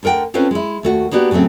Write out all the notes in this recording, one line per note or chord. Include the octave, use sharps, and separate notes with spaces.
D2 D3 A#4 F#5 G5
C4 C#4 F4 A4 B4 C5
G#3 E4
D#2 A3 F#4
A#3 B3 D4 F#4 G4
A2 C#3 F#3 A3 C4